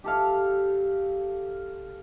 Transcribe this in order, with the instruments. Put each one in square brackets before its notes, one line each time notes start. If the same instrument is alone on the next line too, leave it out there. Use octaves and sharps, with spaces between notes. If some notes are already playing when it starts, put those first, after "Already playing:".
[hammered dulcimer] G4 A4 F5